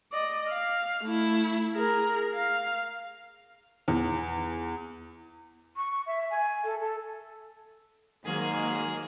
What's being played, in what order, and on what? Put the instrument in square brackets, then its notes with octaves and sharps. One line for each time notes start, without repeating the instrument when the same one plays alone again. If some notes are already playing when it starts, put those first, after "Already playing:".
[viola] D5 D#5
F5
A3 E4
G#4 A#4
F5
[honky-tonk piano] E2
[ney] C#6
E5
G#5
A4
A4
[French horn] G#2 [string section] D#3 F#3 A#3 [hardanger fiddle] G#4